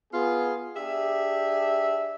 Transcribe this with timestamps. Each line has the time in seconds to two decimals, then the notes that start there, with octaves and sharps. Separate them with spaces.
0.13 B3 F4 G#4
0.76 D4 G4 G#4 E5